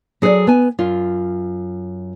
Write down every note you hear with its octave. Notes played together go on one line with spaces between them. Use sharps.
F#3 G#4 A4 B4 D5
B3 G#5
F#2 F4